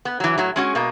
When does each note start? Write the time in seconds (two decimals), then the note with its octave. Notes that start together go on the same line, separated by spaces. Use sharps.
0.05 B3
0.20 E3 F#3
0.38 A2 F#3
0.56 G#3 C#4 F#4
0.75 B2 G#3 A#3